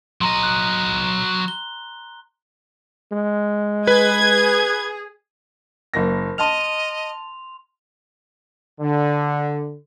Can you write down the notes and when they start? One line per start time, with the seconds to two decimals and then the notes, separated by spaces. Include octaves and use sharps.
0.21 F#3 D#5 A#5 C6
0.43 F#6
1.48 G7
3.12 G#3
3.87 G#4 B4 G#6
5.94 F#1 A#3 A#6
6.38 D#5 A5 C6 F6 F7
8.80 D3